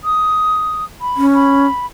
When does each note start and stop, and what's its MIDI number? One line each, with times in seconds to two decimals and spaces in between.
0.04 0.85 87
1.01 1.26 83
1.17 1.66 61
1.34 1.86 83